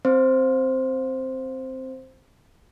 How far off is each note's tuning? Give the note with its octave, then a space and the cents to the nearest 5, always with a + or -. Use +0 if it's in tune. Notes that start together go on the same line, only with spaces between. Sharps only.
C4 +0 C5 +0